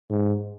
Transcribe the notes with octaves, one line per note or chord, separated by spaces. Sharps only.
G#2